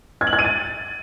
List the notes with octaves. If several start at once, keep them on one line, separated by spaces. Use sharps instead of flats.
G#6
F#7
G#6
D#7
A6